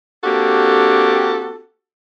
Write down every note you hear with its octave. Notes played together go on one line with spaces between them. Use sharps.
A#3 C4 D4 F#4 G4 A4